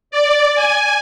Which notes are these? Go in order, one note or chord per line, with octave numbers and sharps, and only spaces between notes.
D5
G#5